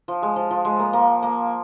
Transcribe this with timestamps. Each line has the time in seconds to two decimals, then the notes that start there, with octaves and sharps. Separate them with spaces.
0.08 F3
0.22 G#3
0.36 F3
0.51 F3
0.65 G#3
0.79 A#3
0.93 A#3
1.23 A#3